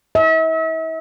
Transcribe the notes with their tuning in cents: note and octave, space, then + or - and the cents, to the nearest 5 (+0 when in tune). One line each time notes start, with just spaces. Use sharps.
E5 -40